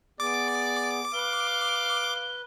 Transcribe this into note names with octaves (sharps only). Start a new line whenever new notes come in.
B3 G#4 D5 D6
B4 F5 G7